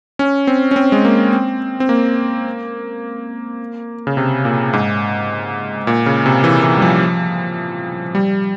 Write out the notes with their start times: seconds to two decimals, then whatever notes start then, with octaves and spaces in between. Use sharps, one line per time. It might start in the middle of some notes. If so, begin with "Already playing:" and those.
0.19 C#4
0.47 C4
0.71 C#4
0.76 C4
0.92 G#3
1.05 A#3
1.33 C4
1.80 C4
1.89 A#3
4.07 C#3
4.17 C3
4.45 A#2
4.73 G#2
5.87 A#2
6.06 C#3
6.26 C3
6.44 E3
6.63 E3
6.77 G3
6.82 F3
8.15 G3